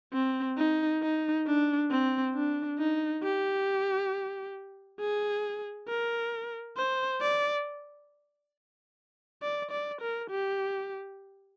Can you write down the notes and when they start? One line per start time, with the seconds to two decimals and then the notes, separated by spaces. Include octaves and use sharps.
0.13 C4
0.57 D#4
1.02 D#4
1.46 D4
1.90 C4
2.35 D4
2.79 D#4
3.23 G4
5.00 G#4
5.89 A#4
6.77 C5
7.21 D5
9.42 D5
9.71 D5
10.01 A#4
10.31 G4